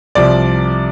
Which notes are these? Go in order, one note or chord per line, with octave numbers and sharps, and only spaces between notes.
C2 C3 F3 D5